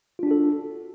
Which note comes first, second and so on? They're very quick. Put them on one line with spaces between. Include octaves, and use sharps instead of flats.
F4 D4 F#4 A4